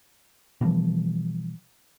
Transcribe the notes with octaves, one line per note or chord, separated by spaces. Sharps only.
B2 E3 F3 G3